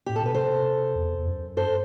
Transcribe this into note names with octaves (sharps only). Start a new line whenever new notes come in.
A2 G4
A4
B2 B4
C3 A4 C5
E2
E2
F#2
G2 A4 C5